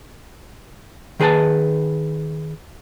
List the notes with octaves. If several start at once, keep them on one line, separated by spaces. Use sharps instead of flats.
D#3 G#4 B4 E5 A5